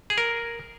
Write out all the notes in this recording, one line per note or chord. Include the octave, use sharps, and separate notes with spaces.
G#4
A#4